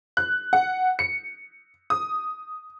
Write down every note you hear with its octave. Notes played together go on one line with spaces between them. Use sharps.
F#6
F#5
C#7
D#6